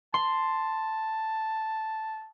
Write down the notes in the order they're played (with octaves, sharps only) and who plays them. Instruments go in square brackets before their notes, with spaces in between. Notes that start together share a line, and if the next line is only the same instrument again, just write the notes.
[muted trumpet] A5 [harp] C6